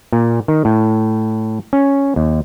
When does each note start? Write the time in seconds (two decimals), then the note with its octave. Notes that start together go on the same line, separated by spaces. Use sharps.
0.12 A#2
0.48 D#3
0.65 A2
1.73 C#4
2.16 D#2